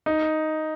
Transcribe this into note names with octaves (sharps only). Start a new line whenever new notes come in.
D#4